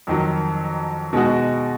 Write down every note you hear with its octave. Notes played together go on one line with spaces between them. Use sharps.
F2 D#3 F#3
B2 G#3 D#4 F#4